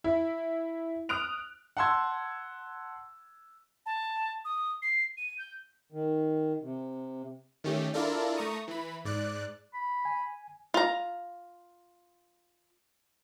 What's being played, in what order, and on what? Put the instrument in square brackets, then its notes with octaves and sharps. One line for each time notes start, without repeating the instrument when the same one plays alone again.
[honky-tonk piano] E4
D#6 F6 F#6 D7 F7
[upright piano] F#5 A5 C6 E6 G#6
[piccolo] A5
D#6
C7
D#7
G6
[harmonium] D#3
C3
[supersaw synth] D#3 A3 C#4 G4
D4 E4 F4 A4 A#4 D5
A3 A#5 C#6 D#6
E3 B5
G#2 D5 F#6
[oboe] B5
[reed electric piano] G#5
[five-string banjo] F4 A#5